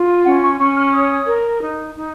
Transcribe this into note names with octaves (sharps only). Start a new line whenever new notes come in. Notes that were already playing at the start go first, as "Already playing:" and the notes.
Already playing: F4
C#4 F#5
C#6
C#4 C#6
F6
C#5 D#6
A#4
D#4
D#4